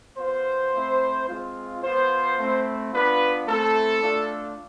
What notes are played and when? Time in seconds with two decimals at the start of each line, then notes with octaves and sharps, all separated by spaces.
0.18 B3 F4 C5
0.74 A3 C4 E4
1.29 G#3 C4 F4
1.83 B3 F4 C5
2.38 A3 C4 E4
2.93 B3 D4 F4 B4
3.48 A3 C4 E4 A4
4.03 A3 D4 F4